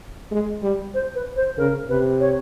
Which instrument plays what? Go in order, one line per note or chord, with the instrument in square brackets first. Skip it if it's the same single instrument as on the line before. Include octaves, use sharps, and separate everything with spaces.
[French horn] G#3
G3
[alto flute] C5
B4
C5
[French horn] C#3 [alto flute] A#4
[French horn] C3 [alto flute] B4
[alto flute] C#5